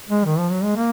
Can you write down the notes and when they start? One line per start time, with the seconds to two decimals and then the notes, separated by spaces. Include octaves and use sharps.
0.09 G#3
0.25 D#3
0.38 F3
0.51 F#3
0.63 G#3
0.76 A#3